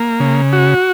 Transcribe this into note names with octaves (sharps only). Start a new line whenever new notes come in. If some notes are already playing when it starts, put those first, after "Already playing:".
Already playing: A#3
C#3
F#4